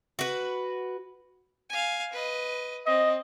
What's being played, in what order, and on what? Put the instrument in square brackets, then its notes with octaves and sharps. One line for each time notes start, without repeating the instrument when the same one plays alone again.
[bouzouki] F#4 B4
[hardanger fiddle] F5 G#5
B4 D#5
[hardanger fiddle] C4 [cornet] D#5